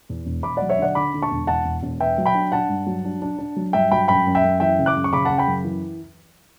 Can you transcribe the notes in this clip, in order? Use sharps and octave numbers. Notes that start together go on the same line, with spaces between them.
E2
E1
E1 B5 D6
F#3 D5 F#5
C#5 E5
D3 D5 F#5
D3 B5 D6
D3
A5 C#6
E1
E2 F#5 A5
E1
E1
B3 E5 G5
F#3
G5 B5
D4
D4 F#5 A5
G2
F#3
D4
D4
D4
F#3
G2 E5 G5
F#3 G5 B5
F#2 G5 B5
F#2
E5 G5
F#2
E3 E5 G5
C#3
D6 F#6
F#2
C#6
C#3 B5 D6
C#3 F#5 A5
G5 B5
F#2
E3